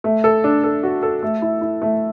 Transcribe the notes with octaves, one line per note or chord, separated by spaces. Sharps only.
A3
A4
D4
A4
F#4
A4
A3
E4
E4
A3